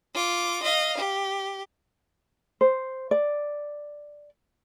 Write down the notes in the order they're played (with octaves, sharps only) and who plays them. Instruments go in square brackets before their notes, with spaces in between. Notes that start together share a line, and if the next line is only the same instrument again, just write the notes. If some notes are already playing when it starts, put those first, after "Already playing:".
[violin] F4 D6
D#5 F5
G4
[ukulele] C5
D5